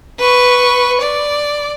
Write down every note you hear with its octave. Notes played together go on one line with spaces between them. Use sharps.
B4 C#6
D5